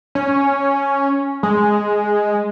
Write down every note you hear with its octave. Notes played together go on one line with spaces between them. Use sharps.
C#4
G#3